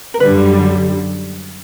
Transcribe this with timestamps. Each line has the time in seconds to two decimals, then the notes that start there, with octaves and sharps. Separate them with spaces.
0.14 A#4
0.20 F#2 D3 G3 B4